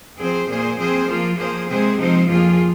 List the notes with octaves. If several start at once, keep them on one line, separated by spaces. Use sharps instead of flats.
F3 C4 G#4 C5
A#2 A#3 G#4 C5
F3 C4 G#4 C5
F3 A#3 F4
F3 A#3 G#4 C5
C3 G#3 C4 G#4 C5
F3 C4 D#4 C5
F2 F3 A#3 F4 G#4